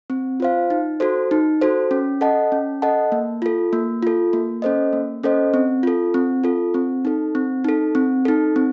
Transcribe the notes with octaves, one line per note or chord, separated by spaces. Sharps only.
C4
F4 C5 F5
D#4
F#4 A4 C5
D#4
F#4 A4 C5
C#4
A4 D#5 F#5 A5
C#4
A4 D#5 F#5 A5
A#3
F4 A4
A#3
F4 A4
A#3
C#4 A4 C5 D#5
A#3
C#4 A4 C5 D#5
C4
F4 A4
C4
F4 A4
C4
D#4 A4
C4
D#4 A4
C4
D#4 A4
C4